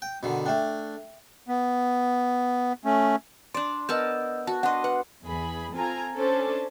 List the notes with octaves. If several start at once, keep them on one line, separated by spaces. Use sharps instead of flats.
G5
B2 D3 D#3
A3 D4 E5 G5
B3
A3 C#4
D4 D5 C6
B3 A#4 D#5 A5 E6 G6
F#4 A5
D4 D#5 F#5 C6
B4 F#5
E2 G#4 B5
C4 F4 A4 G#5 A#5
C#4 D4 A4 C5 A5